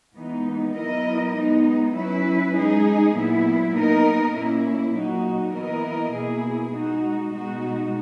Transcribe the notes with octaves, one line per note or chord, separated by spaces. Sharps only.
E3 G#3 B3 D#4
F#3 B3 E4 A#4 D#5
G#3 B3 D#4
F#3 C#4 E4 B4
G#3 D#4 G#4
A#2 F#3 B3 E4
B3 D#4 A#4 D#5
A#2 A#3 C#4 E4
A#2 F#3 A#3 D#4 F#4
E3 B3 E4 A#4 D#5
B2 A#3 E4 G#4
G#3 D#4 F#4
B2 G#3 D#4 F#4